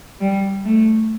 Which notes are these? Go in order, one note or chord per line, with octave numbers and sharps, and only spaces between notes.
G3
A3